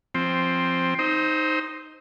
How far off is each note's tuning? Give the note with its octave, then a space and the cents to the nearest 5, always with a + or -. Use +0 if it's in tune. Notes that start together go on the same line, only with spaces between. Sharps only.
F3 +0 C4 +5
D#4 +0 C5 +0 E6 -40